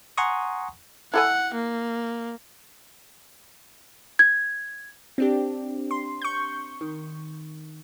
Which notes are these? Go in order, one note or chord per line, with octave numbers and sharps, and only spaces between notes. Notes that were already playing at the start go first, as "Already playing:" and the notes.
F#5 G#5 A#5 C6 C#6 D#6
E4 A4 F#5 G#5
A#3
G#6
C4 D4 G4
C6
C#6 G6
D#3